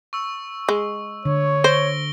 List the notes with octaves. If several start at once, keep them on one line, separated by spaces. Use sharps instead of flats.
C#6 E6
G#3
D3 C#5
C5 A#6 D7 G7